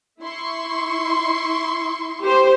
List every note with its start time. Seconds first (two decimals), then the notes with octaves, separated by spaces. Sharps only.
0.21 E4 C6 C#6
2.22 G4 C5